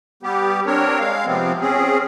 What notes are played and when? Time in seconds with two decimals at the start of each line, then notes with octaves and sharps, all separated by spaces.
0.23 G3 B3 G4
0.66 C4 D4 A#4 C#5
0.99 G#3 F5
1.26 C3 F3 B3 C4
1.60 C4 C#4 G#4